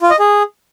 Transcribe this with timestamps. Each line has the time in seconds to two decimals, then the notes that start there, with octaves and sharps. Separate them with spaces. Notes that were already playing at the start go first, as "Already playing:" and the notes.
0.02 F4
0.10 D#5
0.19 G#4